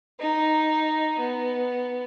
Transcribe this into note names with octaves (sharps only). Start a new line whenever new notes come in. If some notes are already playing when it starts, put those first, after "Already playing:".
D#4
B3